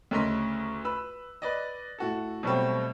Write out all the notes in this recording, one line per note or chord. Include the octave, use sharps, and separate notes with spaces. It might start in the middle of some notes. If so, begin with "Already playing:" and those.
D2 C#3 A#4 D#5 C6 B6
B4 B5 E6
B4 D5 D#5
A2 F#4 A4
B2 F#3 G3 A3 C4